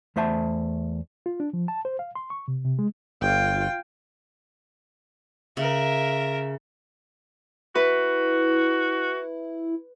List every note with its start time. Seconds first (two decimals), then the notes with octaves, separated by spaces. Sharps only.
0.16 E2 A3 C5 E5 A5
1.26 F4
1.40 D4
1.53 F3
1.68 A5
1.85 C5
1.99 F5
2.15 C6
2.30 C#6
2.48 C3
2.65 C3
2.79 G#3
3.22 G1 F4 G5
5.57 C#3 A#4 E5
7.75 E4 F#4 B4